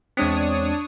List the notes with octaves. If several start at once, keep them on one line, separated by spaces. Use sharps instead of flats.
E2 G#3 C4 D4 C#5 D#6